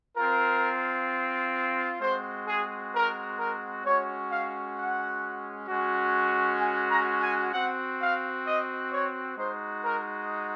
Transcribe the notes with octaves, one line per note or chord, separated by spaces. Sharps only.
C4 F4 A#4
G#3 C4 F#4 C5
G#4
A#4
A#4
G#3 C#4 F#4 C#5
F5
F#5
G#3 C#4 F#4
G#5
A#5
G#5
C4 F#4 F#5
F5
D#5
C#5
G#3 D#4 F#4 C5
A#4